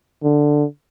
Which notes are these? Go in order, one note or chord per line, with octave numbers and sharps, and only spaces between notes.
D3